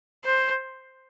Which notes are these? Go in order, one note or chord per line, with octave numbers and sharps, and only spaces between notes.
C5